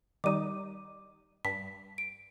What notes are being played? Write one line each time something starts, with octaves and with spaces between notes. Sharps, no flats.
D#3 G3 D#4 D6 D#7
G2 B6
D7